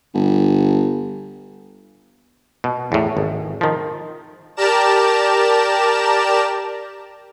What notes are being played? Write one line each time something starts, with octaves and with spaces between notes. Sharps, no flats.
G1
B2
E2 A2
G#1
D#3 F3
G4 A#4 D5 A5 A#5 E7